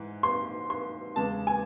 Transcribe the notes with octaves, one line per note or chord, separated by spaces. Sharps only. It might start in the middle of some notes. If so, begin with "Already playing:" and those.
Already playing: G#2 E3
C6
C6
E2 C#3 G#3 A5
G#5